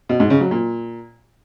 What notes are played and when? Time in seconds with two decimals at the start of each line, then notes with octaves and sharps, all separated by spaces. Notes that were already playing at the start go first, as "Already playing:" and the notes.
0.09 B2
0.20 G#2
0.30 C#3
0.41 F#3
0.51 A#2